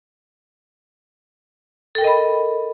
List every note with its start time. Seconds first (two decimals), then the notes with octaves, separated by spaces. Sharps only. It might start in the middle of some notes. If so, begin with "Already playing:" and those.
1.95 A4
1.98 G5
2.01 A#4
2.04 D#5
2.07 B5